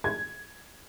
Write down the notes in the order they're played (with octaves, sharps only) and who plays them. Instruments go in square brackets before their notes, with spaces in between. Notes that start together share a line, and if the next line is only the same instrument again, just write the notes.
[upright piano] G#6